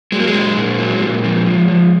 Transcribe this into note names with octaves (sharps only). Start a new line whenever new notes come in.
F#3 G#3
A#3
G#3
A#2
A#2
F#3
A#2
F3
F3
F3